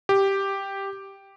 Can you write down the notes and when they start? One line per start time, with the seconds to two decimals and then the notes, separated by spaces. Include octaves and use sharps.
0.09 G4